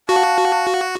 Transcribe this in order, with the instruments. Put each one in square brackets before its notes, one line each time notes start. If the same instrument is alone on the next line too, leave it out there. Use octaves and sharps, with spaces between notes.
[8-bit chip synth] F#4 [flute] F5 [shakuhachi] A5